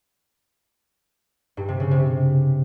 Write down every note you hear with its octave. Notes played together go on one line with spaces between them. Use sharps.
G2
C3
C#3
C3